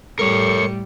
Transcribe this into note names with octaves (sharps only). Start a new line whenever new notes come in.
A2 G3 A4 A#4 C#5 C#7